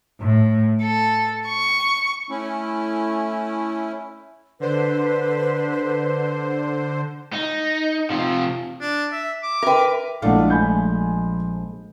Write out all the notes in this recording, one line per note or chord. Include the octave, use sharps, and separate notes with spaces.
A2
A4
C#6
A3 C#4 E4
D3 B4 C5
D#4
C3 F3
D4
E5
D6
A#4 B4 E5 G5
A#1 G#3 A3 D4 E4 D5 F5 F#5
F3 G#5 B5 G6